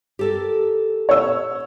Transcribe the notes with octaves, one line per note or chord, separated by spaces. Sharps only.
G4 A4 A#4
C#5 E6